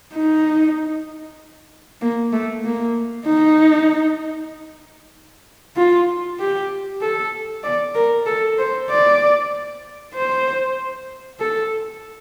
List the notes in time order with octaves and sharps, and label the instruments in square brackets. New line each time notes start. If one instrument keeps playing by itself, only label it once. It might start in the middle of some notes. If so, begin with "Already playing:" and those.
[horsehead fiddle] D#4
A#3
A3
A#3
D#4
F4
G4
A4
D5
A#4
A4
C5
D5
C5
A4